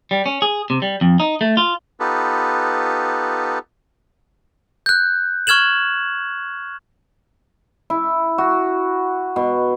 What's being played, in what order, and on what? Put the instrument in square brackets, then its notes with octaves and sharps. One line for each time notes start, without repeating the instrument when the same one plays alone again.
[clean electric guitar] G3
C#4
G#4
C3
G3
F2
D#4
A3
F4
[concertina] B3 D#4 F4 G4 A4 B4
[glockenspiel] F#6 G6
C#6 F6 G#6 E7 F#7
[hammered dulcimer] E4
F#4
B2